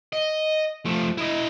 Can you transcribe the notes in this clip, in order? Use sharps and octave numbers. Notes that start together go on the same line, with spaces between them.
D#5
F3 A3
E4 D#5